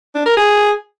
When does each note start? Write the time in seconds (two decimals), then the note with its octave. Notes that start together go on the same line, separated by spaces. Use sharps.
0.15 D4
0.26 A#4
0.37 G#4